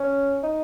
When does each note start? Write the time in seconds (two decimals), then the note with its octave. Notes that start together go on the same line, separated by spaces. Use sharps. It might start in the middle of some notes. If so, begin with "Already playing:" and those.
Already playing: C#4
0.43 D#4